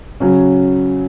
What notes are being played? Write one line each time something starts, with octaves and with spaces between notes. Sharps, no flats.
C#3 F#3 C#4